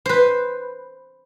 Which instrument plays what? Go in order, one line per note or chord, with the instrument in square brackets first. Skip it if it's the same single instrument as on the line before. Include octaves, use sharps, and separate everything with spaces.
[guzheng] B4 C5